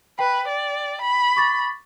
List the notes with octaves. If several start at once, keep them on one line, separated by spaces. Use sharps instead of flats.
B4 G5
D5
B5
C#6 D6 A6